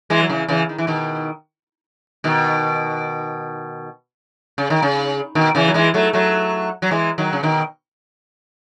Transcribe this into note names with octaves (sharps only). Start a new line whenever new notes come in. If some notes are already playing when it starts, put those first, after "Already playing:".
E3 G#3
F#3
C#3 E3
C#3 E3
D#3
E3
B2 D#3
B2 D#3
C#3
D#3
C#3
B2 D#3
C#3 E3
F#3
E3 G#3
F#3 A3
F#3 A3
F#3
E3 G#3
D#3 F#3
C#3
B2 D#3